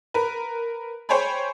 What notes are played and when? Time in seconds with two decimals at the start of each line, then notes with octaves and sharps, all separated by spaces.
0.14 A#4 B4
1.09 C5 C#5 G5 G#5 B5